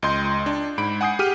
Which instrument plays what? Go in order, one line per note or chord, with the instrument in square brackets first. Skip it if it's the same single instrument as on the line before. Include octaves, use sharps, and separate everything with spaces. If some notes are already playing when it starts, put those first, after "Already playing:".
[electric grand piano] C#2 D#5 C6 G6
D4
G#2 B5 D7
F#5 G#5 D#6 G6 C7
G4 G#4 F6 D#7